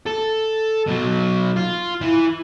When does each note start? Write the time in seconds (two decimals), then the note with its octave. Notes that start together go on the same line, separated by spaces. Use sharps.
0.06 A4
0.88 B2 F#3
1.56 F4
2.01 E3